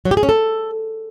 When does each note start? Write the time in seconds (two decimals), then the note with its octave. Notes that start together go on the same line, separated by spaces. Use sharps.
0.05 F#3
0.11 G4
0.17 G#4
0.23 C#4
0.29 A4